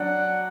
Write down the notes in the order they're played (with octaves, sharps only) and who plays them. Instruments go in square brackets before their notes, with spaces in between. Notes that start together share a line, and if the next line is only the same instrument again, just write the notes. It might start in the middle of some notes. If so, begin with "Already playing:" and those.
Already playing: [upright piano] F#3 D4 F#4 D5 [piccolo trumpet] F#5